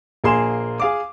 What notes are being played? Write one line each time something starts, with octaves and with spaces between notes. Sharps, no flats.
A#1 A#3 G#4 G#5 C6 E7
G#4 F5 D6